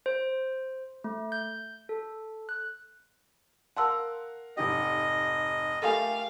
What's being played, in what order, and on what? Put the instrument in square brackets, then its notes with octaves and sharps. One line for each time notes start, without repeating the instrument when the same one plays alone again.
[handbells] C5
A3
G6
A4
F#6
[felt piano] A#4 F5 F#5 [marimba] A5 C6 E6
[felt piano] F1 G#2 G4 [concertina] D#5
[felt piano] A3 G4 A#4 [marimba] A4 G#5 [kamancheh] F5